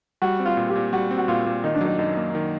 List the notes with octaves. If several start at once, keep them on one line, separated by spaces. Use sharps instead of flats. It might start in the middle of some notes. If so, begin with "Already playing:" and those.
G3 F#4
C4
F4
A#2
G4
A#2
G3 F#4
C4
F#4
A#2 F4
A#2
D#3 D#4
D4
F#3 D#4
F#2 D#4
A#3
D#3